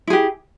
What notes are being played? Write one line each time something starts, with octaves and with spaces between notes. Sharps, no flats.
E4 G4 G#4